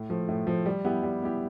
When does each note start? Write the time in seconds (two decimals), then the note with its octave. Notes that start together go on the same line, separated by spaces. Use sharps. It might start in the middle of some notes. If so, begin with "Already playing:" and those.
Already playing: A2
0.10 F3 A3
0.29 A2
0.47 F3 A3
0.66 G3
0.85 B3 E4 G4
1.03 G3
1.22 B3 E4 G4